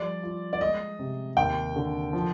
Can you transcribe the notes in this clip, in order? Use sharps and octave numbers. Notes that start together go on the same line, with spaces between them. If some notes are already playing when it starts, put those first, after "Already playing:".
Already playing: F3 G3 D5
F4
D5
G#3 D#5
C3
D#2 G5
D3
F3